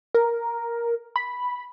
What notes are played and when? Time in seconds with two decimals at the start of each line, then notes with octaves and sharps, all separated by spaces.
0.15 A#4
1.16 B5